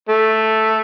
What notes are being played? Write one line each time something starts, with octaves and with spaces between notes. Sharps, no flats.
A3